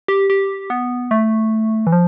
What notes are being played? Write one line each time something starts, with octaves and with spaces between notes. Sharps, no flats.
G4
G4
B3
A3
E3
F3